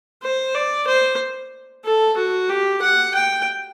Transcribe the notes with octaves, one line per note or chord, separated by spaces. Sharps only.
C5
D5
C5
A4
F#4
G4
F#5
G5